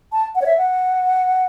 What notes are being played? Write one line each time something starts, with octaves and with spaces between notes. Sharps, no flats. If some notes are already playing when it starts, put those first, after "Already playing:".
A5
F#5
C#5
E5
F#5